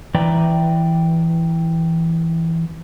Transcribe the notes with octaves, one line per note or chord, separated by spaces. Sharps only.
E3 B4 D5 E5 G5 A#5